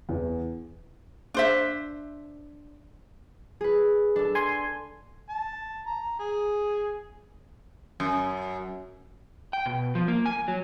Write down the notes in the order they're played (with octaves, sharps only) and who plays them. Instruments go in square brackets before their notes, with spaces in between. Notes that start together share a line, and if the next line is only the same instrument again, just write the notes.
[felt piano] E2
[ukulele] D4 C5 E5
[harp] G#4 B4
D4 A4
[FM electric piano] G#5 C6
[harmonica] A5
A#5
G#4
[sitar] F#2
[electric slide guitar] G5
B2
F3
A#3
G#5
F#3